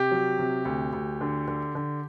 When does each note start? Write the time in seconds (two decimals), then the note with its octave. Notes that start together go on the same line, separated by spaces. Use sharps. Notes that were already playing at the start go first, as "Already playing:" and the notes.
Already playing: C3 G4
0.11 F#3
0.39 C3
0.65 D2
0.93 D2
1.21 D3
1.48 D3
1.75 D3